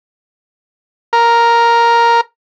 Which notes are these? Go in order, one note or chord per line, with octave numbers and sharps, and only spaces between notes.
A#4